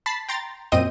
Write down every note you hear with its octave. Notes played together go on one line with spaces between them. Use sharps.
A5 B5 A6 B6 C7
G5 A#5 C6 A6
F#2 A#2 C4 D#5 G5 D#7